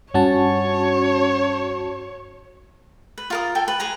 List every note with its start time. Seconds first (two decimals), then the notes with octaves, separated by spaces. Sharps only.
0.14 G2 C#4 F#4 C#5 A5
3.18 B4
3.30 F4 A#4 D#6
3.55 A4 G5 G#5
3.68 B4
3.80 G#4 B4 A#5